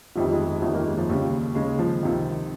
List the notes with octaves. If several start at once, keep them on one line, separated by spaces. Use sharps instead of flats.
G1 F2 D#3 G3
G#3
G#3
G1 F2 D#3 G3
A#3
G#3
F3
D#2 C#3 G3
D#2 C#3 G#3
F3
C#2 C3 D#3